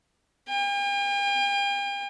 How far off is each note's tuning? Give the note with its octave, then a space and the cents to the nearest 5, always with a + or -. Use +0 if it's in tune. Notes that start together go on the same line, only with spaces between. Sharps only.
G5 +45